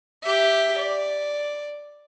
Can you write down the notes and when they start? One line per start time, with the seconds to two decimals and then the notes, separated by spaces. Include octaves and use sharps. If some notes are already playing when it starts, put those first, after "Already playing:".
0.24 G4 E5
0.79 D5